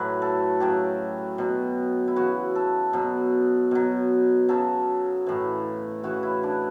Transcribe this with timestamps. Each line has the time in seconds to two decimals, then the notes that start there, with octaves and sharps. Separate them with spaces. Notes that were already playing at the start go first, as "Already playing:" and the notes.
Already playing: A2 F#3 B4
0.22 A4
0.60 C#3 F#3 G4
1.38 B2 F#3
2.08 E4
2.16 C#3 E3 F#4
2.55 A4
2.93 B2 F#3
3.71 B2 F#3
4.49 C#3 F#3 A4
5.27 A2 E3
6.03 C#3 E3 F#4
6.23 E4
6.43 D4